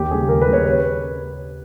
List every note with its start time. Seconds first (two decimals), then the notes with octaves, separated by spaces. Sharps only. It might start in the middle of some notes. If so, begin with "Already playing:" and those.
Already playing: D#2 G4
0.11 C#3 G3 G#4
0.29 D#2 A#4
0.42 B4
0.48 C#3 G3
0.53 C#5
0.66 B4